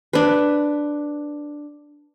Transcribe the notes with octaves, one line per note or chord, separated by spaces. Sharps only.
D4 B4